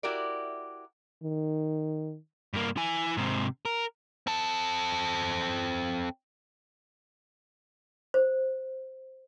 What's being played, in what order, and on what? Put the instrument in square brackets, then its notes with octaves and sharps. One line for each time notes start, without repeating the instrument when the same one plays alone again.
[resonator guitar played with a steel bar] E4 F#4 G4 A#4 D5
[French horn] D#3
[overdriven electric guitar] G2 A#3
E4 G#5
G#2 C3
A#4
[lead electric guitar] C4 A4
[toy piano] C5